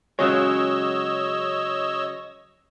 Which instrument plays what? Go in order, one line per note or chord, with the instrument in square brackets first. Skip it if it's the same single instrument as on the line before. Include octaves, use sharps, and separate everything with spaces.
[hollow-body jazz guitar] C#3 F#3 G#3 [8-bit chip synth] C#5 D#5 E6